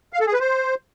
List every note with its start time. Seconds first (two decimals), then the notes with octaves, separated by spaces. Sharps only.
0.13 F5
0.20 A4
0.27 G#4
0.33 B4
0.40 C5